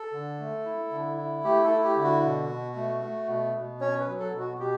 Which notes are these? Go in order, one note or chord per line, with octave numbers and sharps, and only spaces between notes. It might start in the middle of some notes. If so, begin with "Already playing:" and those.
Already playing: A4
D3
A3
E4
D3
E4
A3 G4
A4
E4
G4
D3
F#4
B2
B2
A3
A3
B2
B2
C#4 C#5
B4
F#3
A4
B2
F#4
B2 G4